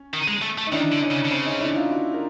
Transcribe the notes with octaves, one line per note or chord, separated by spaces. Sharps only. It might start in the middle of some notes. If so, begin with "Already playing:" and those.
Already playing: C#4
D#3
G#3
A3
A3
D#4
D#3 D4 E4
D3
C#4 D#4
C#3
D3
C#3 C4
C#4 D#4
D4 E4
D#4 F4
E4 F#4
A#4